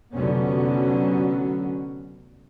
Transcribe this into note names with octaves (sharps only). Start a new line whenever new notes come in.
F1 D3 F#3 B3 C#4